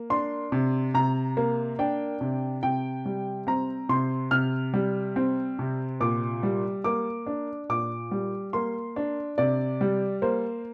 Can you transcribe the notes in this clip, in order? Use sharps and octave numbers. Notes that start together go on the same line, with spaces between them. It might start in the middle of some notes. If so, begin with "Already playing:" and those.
Already playing: A#3
D4 C6
C3
C3 A#5
A#3
D4 G5
C3
C3 G5
G3
C4 A#5
C3 C6
C3 F6
G3
C4
C3
A#2 D6
G3
A#3 D6
D4
A#2 D6
G3
A#3 C6
D4
C3 D5
G3
A#3 C5